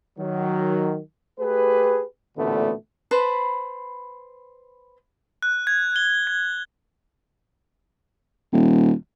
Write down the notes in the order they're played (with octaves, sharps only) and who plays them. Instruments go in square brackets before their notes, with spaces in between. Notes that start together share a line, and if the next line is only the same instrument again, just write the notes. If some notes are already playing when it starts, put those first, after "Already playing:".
[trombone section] D#3 F#3
A3 G4 G#4 B4
A1 D2 A#2 D3 A3 B3
[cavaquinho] B4 C5 A5 B5
[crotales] F#6
G#6
G7
G#6
[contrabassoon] D#1